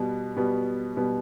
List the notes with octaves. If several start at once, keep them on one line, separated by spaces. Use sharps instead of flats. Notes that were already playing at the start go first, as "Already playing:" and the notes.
Already playing: B2 G3 B3
B2 G3 B3
B2 G3 B3